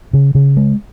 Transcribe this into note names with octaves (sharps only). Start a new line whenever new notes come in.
C#3
C#3
G#3